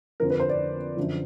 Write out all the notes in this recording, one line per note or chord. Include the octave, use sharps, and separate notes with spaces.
F2 D3 F3 A#4
B4
C5
D5
F#2 D3 F3